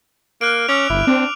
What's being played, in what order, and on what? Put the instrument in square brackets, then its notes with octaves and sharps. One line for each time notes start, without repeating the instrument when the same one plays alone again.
[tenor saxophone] A#3 [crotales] F6 F#6 D7
[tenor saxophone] C#4 [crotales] D6 E6 F7
[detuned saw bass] G1 [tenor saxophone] E4
[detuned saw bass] C4 [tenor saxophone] D4